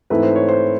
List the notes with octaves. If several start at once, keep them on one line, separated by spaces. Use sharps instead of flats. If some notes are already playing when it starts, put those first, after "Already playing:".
G#2 E3 A3 C4 E4 B4
C5
C#5
C5